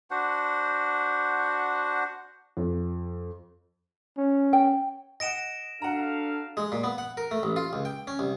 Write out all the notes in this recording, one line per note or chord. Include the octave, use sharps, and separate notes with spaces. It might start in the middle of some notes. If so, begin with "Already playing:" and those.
D4 F#4 C5 F#5
F2
C#4
G5
D#5 F#5 A#6 D7 E7
D4 F#4 A4 F5 F#5 A#5
G#3
A#2
B3
F#5
A#4
A3
A1
F4
C#2
G5
C#4
C2